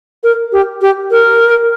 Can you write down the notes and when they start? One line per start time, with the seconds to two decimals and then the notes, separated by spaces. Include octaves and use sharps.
0.24 A#4
0.52 G4
0.82 G4
1.11 A#4